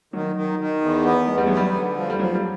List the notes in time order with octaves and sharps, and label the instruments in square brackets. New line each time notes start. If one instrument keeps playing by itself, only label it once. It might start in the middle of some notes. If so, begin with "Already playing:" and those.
[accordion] D#3 [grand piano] F#3
[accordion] D#3
D#3
E2
B3
[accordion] E2 [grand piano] G#3
[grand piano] G3
[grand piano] F#3 [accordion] B3
[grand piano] G3
[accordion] D3
F3
[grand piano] G3
[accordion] F3 [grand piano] F#3
[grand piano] G3